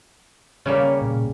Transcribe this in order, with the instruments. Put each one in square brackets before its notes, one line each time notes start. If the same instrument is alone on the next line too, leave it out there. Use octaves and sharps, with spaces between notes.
[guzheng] C#3 G3 A#3 [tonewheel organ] C#5
[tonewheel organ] A#2